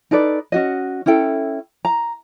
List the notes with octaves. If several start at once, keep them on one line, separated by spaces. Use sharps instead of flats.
D#4 A4 B4 D5
C#4 F#4 D#5
C#4 E4 A4 G5
A#5